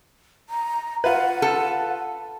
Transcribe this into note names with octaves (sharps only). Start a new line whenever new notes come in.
A#5
F4 B4 F#5
A4